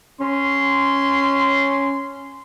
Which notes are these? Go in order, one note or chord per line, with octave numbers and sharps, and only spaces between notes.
C#4 C6